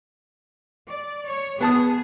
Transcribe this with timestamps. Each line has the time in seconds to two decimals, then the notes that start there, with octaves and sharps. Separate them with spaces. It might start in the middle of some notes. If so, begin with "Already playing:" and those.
0.91 D5
1.27 C#5
1.61 B3 G#4 A5 D#6